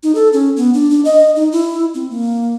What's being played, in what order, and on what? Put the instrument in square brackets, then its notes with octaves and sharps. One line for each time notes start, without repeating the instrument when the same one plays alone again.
[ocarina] D#4
A4
C#4
B3
D4
D4
D#5
D#4
E4
C4
A#3